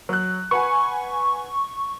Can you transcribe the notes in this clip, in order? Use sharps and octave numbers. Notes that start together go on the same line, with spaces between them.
F#3 F#6
B4 F#5 G#5 C#6